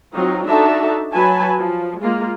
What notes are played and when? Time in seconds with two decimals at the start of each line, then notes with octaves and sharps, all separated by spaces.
0.13 F#3 C4 D#4 F4
0.46 D4 D#4 F#4 A4 E5 A5
1.13 F#3 F#4 B4 G#5 A5 B5
1.59 F3
2.00 G#3 A#3 F4